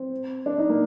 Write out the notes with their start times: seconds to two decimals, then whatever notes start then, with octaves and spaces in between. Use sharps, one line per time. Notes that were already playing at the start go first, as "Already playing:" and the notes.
Already playing: C4
0.46 D4
0.58 D#4
0.69 A#3